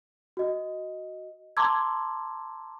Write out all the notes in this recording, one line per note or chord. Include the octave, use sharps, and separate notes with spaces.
F#4 D#5
A5 A#5 C6 D6 E6 G#6